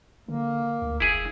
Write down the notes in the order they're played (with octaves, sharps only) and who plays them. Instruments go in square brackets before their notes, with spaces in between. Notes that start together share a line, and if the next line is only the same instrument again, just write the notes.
[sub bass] D3 [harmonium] A#3
[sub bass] D2
[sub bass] F1 [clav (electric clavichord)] E4 G#4